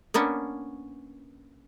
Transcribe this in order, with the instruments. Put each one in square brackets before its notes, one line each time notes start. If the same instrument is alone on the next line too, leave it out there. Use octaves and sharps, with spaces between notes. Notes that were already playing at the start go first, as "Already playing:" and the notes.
[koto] A#3 B3 C#4 D4